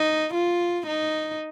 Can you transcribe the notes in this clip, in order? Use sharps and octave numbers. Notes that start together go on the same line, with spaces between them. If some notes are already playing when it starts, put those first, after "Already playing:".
Already playing: D#4
F4
D#4